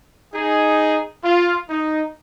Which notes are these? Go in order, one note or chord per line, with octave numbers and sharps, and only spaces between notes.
D#4 G#4
F4
D#4